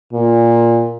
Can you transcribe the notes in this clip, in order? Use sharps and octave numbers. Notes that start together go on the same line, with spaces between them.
A#2